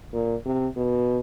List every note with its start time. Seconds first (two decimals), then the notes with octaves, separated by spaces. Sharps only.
0.13 A#2
0.45 C3
0.77 B2